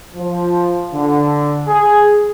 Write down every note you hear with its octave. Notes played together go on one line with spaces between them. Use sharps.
F3
D3
G#4